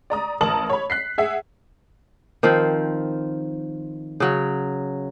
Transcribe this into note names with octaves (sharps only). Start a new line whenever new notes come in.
D5 A#5 D#6
A1 A#4 A5 D#6 F#7
C#5 B5
F#6 B6 C7
G#4 E5 F#5
D#3 F3 C4
C#3 F#3